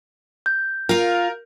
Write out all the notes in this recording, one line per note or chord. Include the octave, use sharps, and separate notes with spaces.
G6
F4 A#4 F5